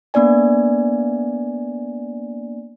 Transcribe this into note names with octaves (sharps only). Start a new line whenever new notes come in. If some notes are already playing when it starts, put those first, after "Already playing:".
A#3 B3 D4 D5 G#5